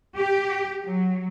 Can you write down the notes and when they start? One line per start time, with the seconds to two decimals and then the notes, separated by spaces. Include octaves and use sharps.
0.15 G4
0.84 F#3